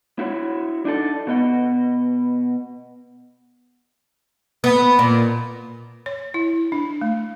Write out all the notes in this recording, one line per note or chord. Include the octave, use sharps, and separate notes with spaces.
E4 F#4 C#5
D4 D#4 A4
B2 B3 D#5 F#5
B3
A#2
C#5
E4
D4
A3